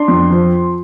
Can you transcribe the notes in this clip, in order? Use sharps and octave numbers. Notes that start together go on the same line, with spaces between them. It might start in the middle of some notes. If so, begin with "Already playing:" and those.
Already playing: D4 C6
F2
F3